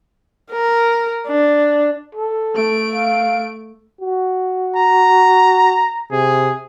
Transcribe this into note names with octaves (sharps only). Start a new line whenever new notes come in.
A#4
D4
A4
A3 D7
F5
F#4
A#5
C3 G#4